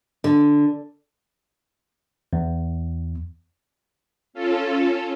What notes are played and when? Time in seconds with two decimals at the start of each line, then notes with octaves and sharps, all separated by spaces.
0.24 D3
2.33 E2
4.33 C#4 F4 A4